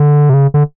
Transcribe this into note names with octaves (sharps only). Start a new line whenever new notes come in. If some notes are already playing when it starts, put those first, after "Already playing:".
Already playing: D3
C3
C#3
D3